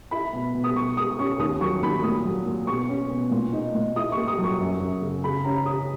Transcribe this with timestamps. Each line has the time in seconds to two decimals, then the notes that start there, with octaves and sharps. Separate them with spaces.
0.11 E4 B5
0.33 B2
0.55 B2
0.64 D#6
0.75 B2 C#6
0.97 G#3 D#6
1.19 C#4 C#6
1.39 D#2 D#6
1.60 F#3 C#6
1.82 D#2 B5
2.03 A#2 D#6
2.25 F#3
2.46 A#2
2.67 B2 C#6
2.89 C#4
3.11 B2
3.31 A#2
3.53 D#4
3.75 A#2
3.96 E4 D#6
4.12 A#3 C#6
4.28 D#6
4.38 F#3
4.44 C#6
4.59 F#2
4.80 F#2
5.02 C#3
5.24 C#3 B5
5.44 C#4 A#5
5.66 C#4 D#6